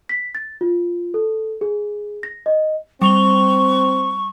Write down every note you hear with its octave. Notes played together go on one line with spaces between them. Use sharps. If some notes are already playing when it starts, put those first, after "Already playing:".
B6
A6
F4
A4
G#4
A#6
D#5
G3 C4 C#6 F7 G7